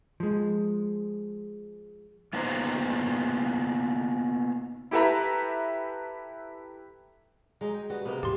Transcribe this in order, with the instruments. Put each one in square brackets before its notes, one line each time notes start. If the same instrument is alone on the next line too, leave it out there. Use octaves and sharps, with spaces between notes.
[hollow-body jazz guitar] F3 G#3
[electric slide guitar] A#3 B3 D#4 F4 C5 A#5
[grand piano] E4 G4 A4 B4 E5 A#5
[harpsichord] F#3 D#4 [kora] G#3
[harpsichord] G5
[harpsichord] G3 B3 [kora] F#4
[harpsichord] C3 D#4 [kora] A#3 B3
[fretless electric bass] E2 A2 F3 [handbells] G4 C6